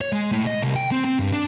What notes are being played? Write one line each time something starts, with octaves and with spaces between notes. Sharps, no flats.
C#5
G#3
A2
D#5
C2
G5
C4
C4
G2
D4